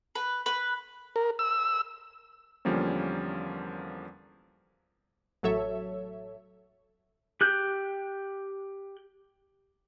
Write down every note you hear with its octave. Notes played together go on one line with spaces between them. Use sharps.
B4
B4
A#4
E6
E2 D3 F3 G3 A#3 C#4
A1 F#3 A4 C#5 E5
G4 F#6 G6